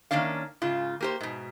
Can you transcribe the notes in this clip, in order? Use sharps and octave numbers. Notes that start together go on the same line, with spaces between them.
D#3 F3 A#3 C#4 D4 F5
G#2 C#3 F4
A#3 G4 C5
G#2 B2